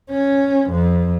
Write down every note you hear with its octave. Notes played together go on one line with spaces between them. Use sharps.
C#4
F2